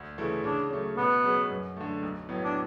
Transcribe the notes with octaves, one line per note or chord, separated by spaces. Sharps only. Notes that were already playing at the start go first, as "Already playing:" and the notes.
Already playing: D2
C#3 E3 A3 E4
C#3 D4
F#3 A3 C#4
B2 B3
F#3 C#4 G#4 B4
F#2
D3 A3
B1
A2 F#3 B3
D4